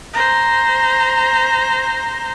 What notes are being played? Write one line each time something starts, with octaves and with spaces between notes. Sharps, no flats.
C5 A#5